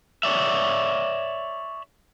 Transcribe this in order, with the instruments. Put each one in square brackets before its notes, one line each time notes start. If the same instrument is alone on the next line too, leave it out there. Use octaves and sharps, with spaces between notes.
[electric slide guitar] C#5 D5 E5